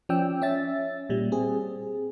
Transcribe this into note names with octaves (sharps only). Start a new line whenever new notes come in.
F3 C#4 D5 G5 E6
C#4 E5 A6
A#2 G3
C4 G#4